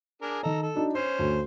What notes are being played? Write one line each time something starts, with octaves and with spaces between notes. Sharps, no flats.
D4 G#4 A#4
D#3 A4 D#5 A#5
A4
D4 D#4 F#4
C#4 C5 C7
D2